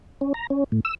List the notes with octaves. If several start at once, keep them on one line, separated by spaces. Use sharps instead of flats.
C#4
A#5
C#4
A2
E6